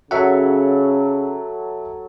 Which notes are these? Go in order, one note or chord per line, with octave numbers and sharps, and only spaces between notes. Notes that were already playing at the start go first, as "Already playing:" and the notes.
C#3 F#3 A4 C#5 E5 F#5